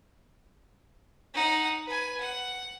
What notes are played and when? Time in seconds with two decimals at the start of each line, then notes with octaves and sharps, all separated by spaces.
1.34 D#4 F#5
1.86 B4 G#5
2.20 F#5